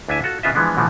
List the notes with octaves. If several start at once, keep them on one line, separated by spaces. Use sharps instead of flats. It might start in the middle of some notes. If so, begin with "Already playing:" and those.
D2 D4 E4 E5 G#5 A5
F4 F#4 A4
C#3 B3 F4 D#5 E5
E3 F3 G#3 B3 D4
B2 D3 E3 F3 A3 B3